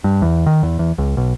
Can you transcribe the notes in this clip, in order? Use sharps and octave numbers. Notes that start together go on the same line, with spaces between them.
G2
E2
D#3
E2
E2
C#2
B1